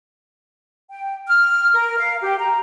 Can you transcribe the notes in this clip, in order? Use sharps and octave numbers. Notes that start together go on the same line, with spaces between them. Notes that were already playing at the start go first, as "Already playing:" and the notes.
G5
F6
A#4
F5
G4
A#5